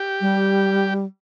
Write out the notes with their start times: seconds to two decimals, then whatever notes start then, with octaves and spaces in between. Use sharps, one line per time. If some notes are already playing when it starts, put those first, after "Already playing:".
Already playing: G4
0.21 G3